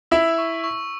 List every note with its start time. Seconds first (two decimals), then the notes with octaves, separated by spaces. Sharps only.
0.11 E4 E5 E6
0.38 C#6
0.64 C#6